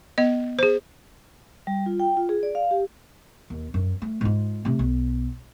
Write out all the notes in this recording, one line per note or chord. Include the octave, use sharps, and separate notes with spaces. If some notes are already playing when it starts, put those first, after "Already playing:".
B3 D#5
G#4 C5
G3
F4
G5
F4
G#4
D5
F5
G4
D#2
F#2
A3
G#2 F4
C3 A3
B1